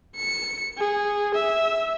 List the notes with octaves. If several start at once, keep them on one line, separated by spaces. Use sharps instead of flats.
C#7
G#4
E5